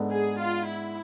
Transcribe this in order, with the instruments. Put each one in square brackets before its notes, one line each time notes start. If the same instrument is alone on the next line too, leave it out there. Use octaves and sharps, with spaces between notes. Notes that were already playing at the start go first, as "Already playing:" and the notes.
Already playing: [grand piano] G#2 G#3 B3 D4 A4
[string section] G#4
F4
E4